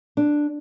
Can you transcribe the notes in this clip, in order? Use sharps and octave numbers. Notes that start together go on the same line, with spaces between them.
D4